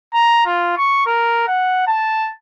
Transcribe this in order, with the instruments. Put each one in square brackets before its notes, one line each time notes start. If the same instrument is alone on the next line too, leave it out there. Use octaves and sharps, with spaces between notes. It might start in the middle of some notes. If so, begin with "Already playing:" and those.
[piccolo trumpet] A#5
F4
C#6
A#4
F#5
A5